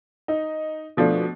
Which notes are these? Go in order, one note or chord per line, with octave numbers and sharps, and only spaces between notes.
D#4
B2 F3 A3 D4